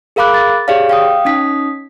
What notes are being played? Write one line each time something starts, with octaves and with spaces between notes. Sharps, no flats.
G#4 A#4 F5 B5 D6 F#6
A6
G4 G#4 C#5 D5 F5
F5 G5 D#6
C#4 D#4 D#6 B6